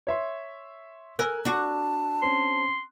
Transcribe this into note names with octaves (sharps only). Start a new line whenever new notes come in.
C#5 E5 C6
A#4 G#5 E6 F#6
D4 F#4 D5 A5
C4 C#4 C6